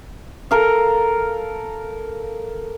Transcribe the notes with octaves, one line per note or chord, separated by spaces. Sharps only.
A4 A#4 F5